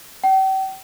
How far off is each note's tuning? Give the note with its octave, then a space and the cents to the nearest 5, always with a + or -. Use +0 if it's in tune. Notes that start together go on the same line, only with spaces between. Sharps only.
G5 -40